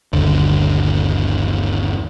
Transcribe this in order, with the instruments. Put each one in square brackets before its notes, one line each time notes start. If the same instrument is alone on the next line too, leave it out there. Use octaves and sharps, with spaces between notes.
[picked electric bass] G1 D#2 D3